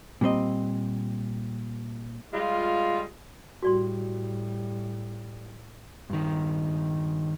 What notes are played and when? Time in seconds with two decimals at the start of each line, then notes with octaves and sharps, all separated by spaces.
0.21 A#2 G3 C4 D#5
2.34 G3 G#3 F4
3.63 A2 G3 F#4 D5 C6
6.10 G2 D#3